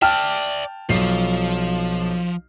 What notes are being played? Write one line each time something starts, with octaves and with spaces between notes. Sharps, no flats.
D5 E5 G5 A5 F6
B1 F3 C7